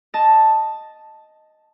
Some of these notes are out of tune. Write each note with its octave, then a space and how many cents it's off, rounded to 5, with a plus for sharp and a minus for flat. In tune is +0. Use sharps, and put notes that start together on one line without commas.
D#5 +0 A5 +0